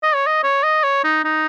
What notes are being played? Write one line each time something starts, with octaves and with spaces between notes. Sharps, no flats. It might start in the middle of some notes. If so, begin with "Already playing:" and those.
D#5
C#5
D#5
C#5
D#5
C#5
D#4
D#4